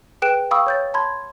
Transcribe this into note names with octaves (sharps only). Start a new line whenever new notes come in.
G#4 B4 G5 F#6 D7 E7
F5 G5 B5 C#6 D#6 E6
C#5 G6 A6
A5 B5 C6 G#6